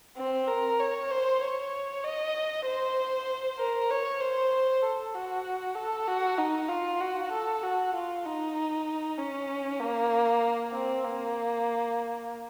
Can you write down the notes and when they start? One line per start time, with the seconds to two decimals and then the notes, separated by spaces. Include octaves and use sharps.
0.18 C4
0.47 A#4
0.80 C#5
1.11 C5
1.41 C#5
2.04 D#5
2.66 C5
3.59 A#4
3.90 C#5
4.20 C5
4.82 A4
5.14 F#4
5.76 A4
6.07 F#4
6.38 D#4
6.69 F4
7.00 F#4
7.32 A4
7.63 F#4
7.94 F4
8.25 D#4
9.18 C#4
9.80 A#3
10.73 C4
11.04 A#3